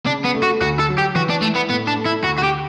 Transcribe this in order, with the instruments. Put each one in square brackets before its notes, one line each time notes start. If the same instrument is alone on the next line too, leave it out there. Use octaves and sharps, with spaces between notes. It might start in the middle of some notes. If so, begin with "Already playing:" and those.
[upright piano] C#3 [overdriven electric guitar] D4
[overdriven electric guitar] B3
[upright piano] A3
[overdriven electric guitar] F#4
[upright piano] D2 [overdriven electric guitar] F#4
[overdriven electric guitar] A4
[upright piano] F#3
[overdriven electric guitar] G4
[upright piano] E3 [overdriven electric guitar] F#4
[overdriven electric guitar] D4
[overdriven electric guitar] A3 [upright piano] E4
[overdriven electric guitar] B3
[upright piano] A2 [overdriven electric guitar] B3
[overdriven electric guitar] D4
[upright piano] A3
[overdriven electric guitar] E4
[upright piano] D2 [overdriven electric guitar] F#4
[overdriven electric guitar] F#4
G4